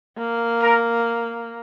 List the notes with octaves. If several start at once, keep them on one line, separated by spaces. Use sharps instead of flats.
A#3
A#4